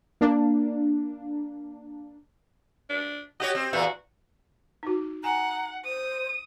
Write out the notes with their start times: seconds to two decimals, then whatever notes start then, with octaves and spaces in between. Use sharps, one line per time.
0.21 A#3 D4
2.90 D4
3.40 F#4 G4 C#5 D#5
3.55 C4
3.73 E2 A#2 E3 F#4
4.83 D#4 F#4
5.24 F#5 G#5 A#5
5.85 C5 D#6